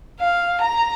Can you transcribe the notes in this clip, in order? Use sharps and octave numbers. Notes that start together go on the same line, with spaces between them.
F5
A#5